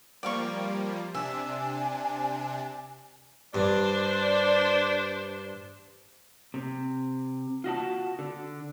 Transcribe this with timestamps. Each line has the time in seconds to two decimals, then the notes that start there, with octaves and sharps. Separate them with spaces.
0.23 F3 G3 A#3 D5 F5 C#6
1.14 C3 D4 E5 G#5
3.54 G2 D4 C5 D5
6.54 C3
7.64 F4 F#4 D#5 A5
8.19 D3